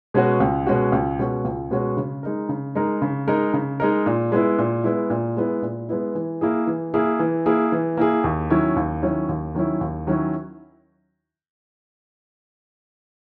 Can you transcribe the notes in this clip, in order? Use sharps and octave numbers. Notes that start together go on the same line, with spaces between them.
B2 G#3 C#4 F#4
C#2
B2 G#3 C#4 F#4
C#2
B2 G#3 C#4 F#4
C#2
B2 G#3 C#4 F#4
C#3
G#3 D#4 A#4
C#3
G#3 D#4 A#4
C#3
G#3 D#4 A#4
C#3
G#3 D#4 A#4
A#2
G#3 B3 E4
A#2
G#3 B3 E4
A#2
G#3 B3 E4
A#2
G#3 B3 E4
E3
A#3 E4 G#4
E3
A#3 E4 G#4
E3
A#3 E4 G#4
E3
A#3 E4 G#4
D#2
D#3 F#3 C#4 E4
D#2
D#3 F#3 C#4 E4
D#2
D#3 F#3 C#4 E4
D#2
D#3 F#3 C#4 E4